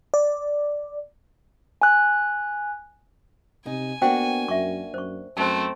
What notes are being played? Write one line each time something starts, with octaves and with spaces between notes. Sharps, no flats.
D5
G#5 F#6
C3 D#4 G#5
A#3 B3 D4 F#4 C5 F#5 G5
F#2 E5 C#6
F#2 C5 C#6
F#2 A3 C4 C5 A5